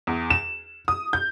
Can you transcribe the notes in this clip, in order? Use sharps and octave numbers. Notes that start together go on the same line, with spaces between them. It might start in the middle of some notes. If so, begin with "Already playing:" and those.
E2
E7
D#6
G6